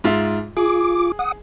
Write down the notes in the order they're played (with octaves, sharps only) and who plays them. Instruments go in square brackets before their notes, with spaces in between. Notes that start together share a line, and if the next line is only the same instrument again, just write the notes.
[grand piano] G#2 F4 E5
[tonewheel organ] F4 D6 [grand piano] G#4
[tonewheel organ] F#5 D#6